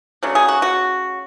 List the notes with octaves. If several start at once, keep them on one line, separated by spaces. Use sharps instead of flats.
C#3 F#3 A3 D4
G#4
F#4
F#4